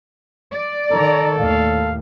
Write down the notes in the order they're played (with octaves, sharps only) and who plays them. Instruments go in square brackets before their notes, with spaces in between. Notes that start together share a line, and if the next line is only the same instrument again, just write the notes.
[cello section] D5
[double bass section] D#3 [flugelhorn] A4 [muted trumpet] A#5
[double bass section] D#2 A2 [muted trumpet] F5